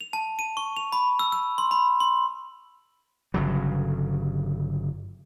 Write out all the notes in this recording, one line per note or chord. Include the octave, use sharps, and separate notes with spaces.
F7
A5
D#7
C#6
F7
B5
E6
E6
C6
B5
C6
G1 C#3 F#3